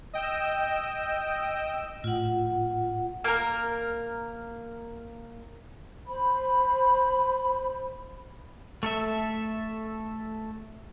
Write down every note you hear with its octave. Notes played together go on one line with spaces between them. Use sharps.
D#5 G5 E6
A2 F4 F#5
A#3 A#4
C5 B5
A3 A4 E5